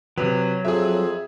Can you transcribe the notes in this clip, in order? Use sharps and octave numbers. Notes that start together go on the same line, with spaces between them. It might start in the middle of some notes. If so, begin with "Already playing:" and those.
C3 F#3 B4
F2 G#4 E5